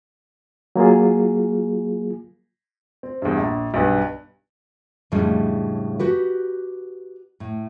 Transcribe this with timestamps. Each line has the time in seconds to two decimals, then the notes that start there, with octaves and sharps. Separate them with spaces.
0.76 F#3 A#3 F4 G#4
3.03 C4
3.22 E2 G2
3.37 A#1
3.74 B1 G2 B4
5.12 F2 A2 C#3 G3 G#3 D4
6.00 F#4 G4 B4
7.40 A2